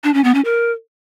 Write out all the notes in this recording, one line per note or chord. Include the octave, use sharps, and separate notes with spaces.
D4
C#4
B3
C#4
A#4